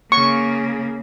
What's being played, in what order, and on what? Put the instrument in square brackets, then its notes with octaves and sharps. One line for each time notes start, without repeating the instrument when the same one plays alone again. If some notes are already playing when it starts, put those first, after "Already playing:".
[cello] C#3 A#3 [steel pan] C#6